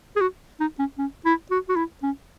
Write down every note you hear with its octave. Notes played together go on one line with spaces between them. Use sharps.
G#4
F#4
D#4
C#4
C#4
E4
F#4
F#4
E4
C#4